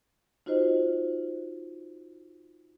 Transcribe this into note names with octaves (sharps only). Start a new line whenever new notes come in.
D#4 F4 F#4 C5 D#5